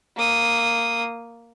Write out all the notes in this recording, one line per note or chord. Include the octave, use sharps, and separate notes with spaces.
A#3 D#6